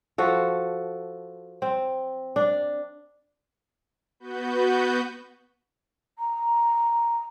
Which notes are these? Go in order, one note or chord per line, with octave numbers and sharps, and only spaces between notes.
F3 F#4 A4
C4
D4
B3 F#4 B4 G6
A#5